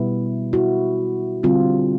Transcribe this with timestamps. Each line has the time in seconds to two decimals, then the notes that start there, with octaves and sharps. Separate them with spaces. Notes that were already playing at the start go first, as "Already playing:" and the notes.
Already playing: B2 G3 B3 E4
0.53 E4 F#4
1.43 D3 G3 C4 F4